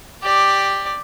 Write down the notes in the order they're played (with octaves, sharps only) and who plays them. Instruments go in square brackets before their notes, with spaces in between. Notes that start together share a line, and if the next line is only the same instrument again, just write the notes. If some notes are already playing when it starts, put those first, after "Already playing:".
[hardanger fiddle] G4 D5